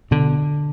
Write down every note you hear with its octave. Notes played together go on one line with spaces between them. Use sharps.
B2 D3